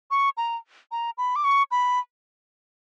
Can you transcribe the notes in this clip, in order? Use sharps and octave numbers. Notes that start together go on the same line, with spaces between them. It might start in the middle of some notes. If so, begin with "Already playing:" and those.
C#6
A#5
A#5
B5
D6
C#6
B5